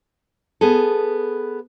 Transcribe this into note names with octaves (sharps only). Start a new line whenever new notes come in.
B3 G#4 A4